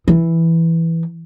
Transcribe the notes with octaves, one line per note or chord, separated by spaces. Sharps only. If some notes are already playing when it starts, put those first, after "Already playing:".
E3